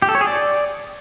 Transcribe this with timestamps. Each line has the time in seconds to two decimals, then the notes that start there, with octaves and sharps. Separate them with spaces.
0.02 G4
0.09 A4
0.15 C#5
0.21 G#4
0.27 D5